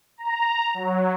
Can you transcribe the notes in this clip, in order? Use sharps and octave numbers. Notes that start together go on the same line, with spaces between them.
A#5
F#3